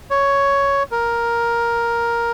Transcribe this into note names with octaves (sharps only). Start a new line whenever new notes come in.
C#5
A#4